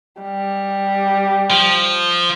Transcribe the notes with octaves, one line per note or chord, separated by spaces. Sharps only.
G3
F3